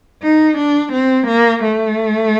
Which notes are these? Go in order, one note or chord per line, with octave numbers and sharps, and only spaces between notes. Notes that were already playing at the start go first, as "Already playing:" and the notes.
D#4
D4
C4
A#3
A3